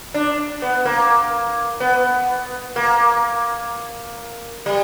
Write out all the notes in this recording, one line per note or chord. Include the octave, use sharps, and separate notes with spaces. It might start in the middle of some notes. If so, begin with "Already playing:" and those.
D4
B3
A#3
B3
A#3
G3